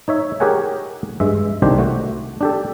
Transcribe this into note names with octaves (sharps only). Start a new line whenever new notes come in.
D#4 C#5 E5
G4 G#4 A#4 C#5 F#5 G#5
G2 G#3 E5
C2 D#3 D4 G4 C5
A3 F#4
D4 G4 A4